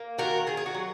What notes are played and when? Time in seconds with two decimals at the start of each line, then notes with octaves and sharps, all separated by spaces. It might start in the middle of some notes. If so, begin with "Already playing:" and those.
Already playing: A#3
0.18 D#3 F#4 A#4
0.47 D#3 G#4
0.57 G#4
0.66 F#4
0.74 F#3